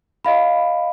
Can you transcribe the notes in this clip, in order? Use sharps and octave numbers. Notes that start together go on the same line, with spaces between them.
D#5 F5 B5